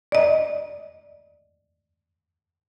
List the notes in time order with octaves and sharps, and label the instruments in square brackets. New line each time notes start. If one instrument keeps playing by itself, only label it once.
[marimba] D5 D#5